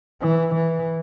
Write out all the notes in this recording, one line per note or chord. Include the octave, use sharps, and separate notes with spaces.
E3
E3